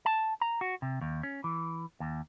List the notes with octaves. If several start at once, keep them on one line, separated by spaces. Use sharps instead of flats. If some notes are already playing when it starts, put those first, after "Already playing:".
A5
A#5
F#4
C3
D#2
C#4
E3
D#2